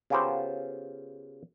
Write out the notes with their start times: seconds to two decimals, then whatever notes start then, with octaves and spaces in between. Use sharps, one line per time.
0.10 C#3 B3 F4 G4 A4 C5